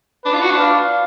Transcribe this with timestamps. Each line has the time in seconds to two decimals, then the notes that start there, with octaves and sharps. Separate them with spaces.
0.25 D4 B4
0.34 F4
0.42 F#4
0.50 D4
0.58 F5